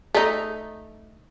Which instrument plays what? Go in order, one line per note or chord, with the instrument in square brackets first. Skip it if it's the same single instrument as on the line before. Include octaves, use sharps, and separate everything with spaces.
[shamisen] A3 D#4